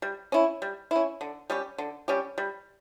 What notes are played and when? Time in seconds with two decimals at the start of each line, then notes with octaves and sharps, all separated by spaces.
0.02 G3
0.32 C#4 E4
0.62 G3
0.91 C#4 E4
1.21 D3
1.50 G3 C#4 G4
1.78 D3
2.08 G3 C#4 G4
2.38 G3